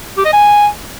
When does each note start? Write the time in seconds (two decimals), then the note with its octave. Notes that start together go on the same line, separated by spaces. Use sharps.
0.17 G4
0.25 D#5
0.33 G#5